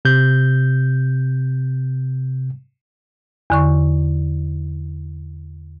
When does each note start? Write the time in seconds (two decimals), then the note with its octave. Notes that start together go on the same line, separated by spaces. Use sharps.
0.05 C3 G6
3.50 E2 D3 C#6